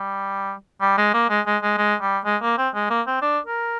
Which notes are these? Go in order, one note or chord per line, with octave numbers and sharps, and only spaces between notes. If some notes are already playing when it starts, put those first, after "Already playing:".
Already playing: G3
G3
G#3
A#3
G#3
G#3
G#3
G#3
G3
G#3
A#3
C4
G#3
A#3
C4
D4
A#4